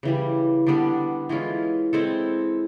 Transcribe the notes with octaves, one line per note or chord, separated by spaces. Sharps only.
C#3 E3 G3
D3 G3 B3 D4
E3 G#3 C#4 F4
G#3 C4 E4 A4